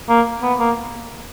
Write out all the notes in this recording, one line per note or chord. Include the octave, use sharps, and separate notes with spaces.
A#3
B3
A#3